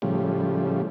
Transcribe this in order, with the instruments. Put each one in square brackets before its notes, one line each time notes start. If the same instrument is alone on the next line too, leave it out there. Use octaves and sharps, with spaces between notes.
[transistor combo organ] A2 C#3 F3 G3